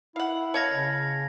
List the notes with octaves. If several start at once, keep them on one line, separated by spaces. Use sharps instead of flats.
E4 F5 F#5
C#5 D#5 F5 A5 G#6 A#6
C#3